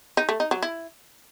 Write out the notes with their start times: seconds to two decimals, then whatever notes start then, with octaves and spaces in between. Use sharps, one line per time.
0.17 D#4
0.29 A3
0.40 D#4
0.51 F#3
0.63 E4